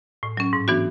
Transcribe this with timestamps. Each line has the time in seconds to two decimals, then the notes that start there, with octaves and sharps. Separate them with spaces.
0.23 A2
0.37 F#3 C#4
0.53 G#2
0.68 E3 B3 D4 F#4